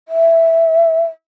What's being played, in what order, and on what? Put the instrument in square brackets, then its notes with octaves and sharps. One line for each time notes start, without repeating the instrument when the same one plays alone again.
[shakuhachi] E5